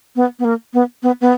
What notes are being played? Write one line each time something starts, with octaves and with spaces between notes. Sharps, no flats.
B3
B3
A#3
B3
B3
B3